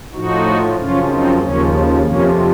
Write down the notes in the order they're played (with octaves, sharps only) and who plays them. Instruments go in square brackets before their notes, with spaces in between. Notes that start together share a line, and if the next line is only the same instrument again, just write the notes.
[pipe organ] A2 F3 D#4 F#4
F#2 C#3 F3 C#4 F4
C4 D#4
D#2 C#3 F3 A#3 C#4
F2 C3 F3 A#3 C#4